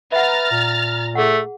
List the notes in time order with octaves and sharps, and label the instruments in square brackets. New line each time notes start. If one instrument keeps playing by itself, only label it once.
[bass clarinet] B4 [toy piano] E5 F#5 [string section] A#5 F6 A6
[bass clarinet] A#2
[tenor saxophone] A3 [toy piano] G#4 F#5